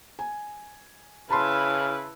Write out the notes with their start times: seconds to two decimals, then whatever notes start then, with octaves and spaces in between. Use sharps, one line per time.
0.19 G#5
1.30 C#3 E4 B4 A5 B5 C6 F6